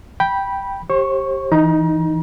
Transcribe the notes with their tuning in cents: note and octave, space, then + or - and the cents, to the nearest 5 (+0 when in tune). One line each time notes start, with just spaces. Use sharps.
G5 +0 B5 -15
G4 -5 C5 +40 C#6 +0
E3 +0 D#4 +0 A#5 +35